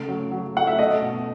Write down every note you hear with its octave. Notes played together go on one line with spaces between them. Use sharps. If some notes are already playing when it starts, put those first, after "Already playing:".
Already playing: C#3 A3
F#3
F#3
A3 F#5
E5
A3 D#5
B2